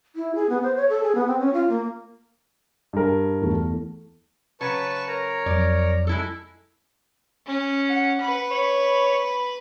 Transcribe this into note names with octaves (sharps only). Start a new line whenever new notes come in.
E4
G#4
B3
C5
C#5
A4
G#4
B3
C4
C#4
F4
A#3
G2 A#4
E2 A3
C#3 F#3 B4 A5 C#6
A#4 C#5 A#5
F2 F#3 D5
G#3 E4 A4
C#4
F#5
B4 B5
C#5